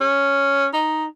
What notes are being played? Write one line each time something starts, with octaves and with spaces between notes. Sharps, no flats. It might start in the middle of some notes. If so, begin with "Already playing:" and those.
C#4
D#4